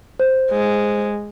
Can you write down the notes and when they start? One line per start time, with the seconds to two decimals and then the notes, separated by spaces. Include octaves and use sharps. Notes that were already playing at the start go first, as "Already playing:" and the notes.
0.20 C5
0.51 G#3